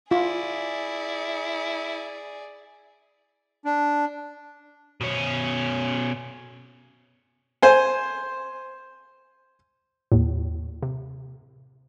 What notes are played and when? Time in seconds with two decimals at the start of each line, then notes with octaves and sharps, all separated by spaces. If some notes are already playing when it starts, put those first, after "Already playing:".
0.11 E4 F4 G#4 D5
3.65 D4
5.01 B2 C#4
7.62 C5 G#5
10.12 D#2 A2
10.82 C3